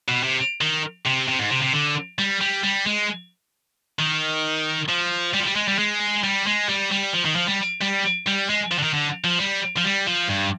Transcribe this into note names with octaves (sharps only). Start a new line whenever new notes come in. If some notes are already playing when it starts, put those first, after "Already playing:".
B2
C3
D#3
C3
C3
G#2
C3
C3
D3
G3
G3
G3
G#3
D#3
F3
G3
F3
G3
G#3
G3
G#3
G3
G#3
G3
G3
F3
D#3
F3
G3
G3
G3
G#3
F3
D3
D#3
D3
F3
G3
F3
G3
F3
G2